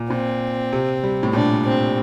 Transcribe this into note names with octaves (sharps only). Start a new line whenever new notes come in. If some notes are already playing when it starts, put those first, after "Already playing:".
Already playing: A#2
A#2 C4
C3
G3
A2
A#2 D4
C4